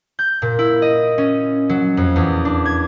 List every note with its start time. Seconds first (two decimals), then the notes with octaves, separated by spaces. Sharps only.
0.19 G6
0.42 A#2
0.59 E4
0.82 D#5
1.18 C#4
1.69 F#3
1.97 F2
2.16 E2
2.45 D4
2.66 G#6